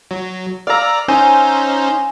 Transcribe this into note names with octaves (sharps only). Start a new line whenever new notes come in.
F#3
D5 F5 A#5 E6
C#4 D#4 C5 G#5